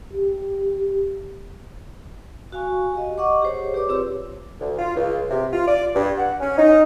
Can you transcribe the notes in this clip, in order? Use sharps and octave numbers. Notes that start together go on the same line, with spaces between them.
G4
F#4 F5 G#5 C#6
G4 D#5
D#5 F#5 C#6 D6
G4 G#4 C5 C#5
G4 B4 D5 D6
C4 F4 G4 G#4 C#5 E6
D2
F4
C#2
C3
F4
D5
G2
F#5
C#4
D#4